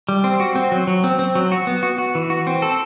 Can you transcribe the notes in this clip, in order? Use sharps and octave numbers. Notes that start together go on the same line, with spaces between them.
G3
C4
F#4
C4
F#3
F#3
C4
C4
F#3
F#4
B3
F#4
F#4
E3
F#4
C4
A4